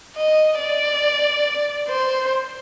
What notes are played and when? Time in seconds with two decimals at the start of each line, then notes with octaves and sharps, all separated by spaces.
0.16 D#5
0.59 D5
1.89 C5